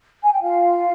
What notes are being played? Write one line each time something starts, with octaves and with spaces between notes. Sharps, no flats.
G#5
G5
F4 F5